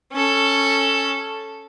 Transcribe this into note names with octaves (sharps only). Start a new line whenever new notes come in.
C#4 A4